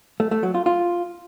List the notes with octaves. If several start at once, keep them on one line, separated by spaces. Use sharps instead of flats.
A3
A3
F#3
F4
F4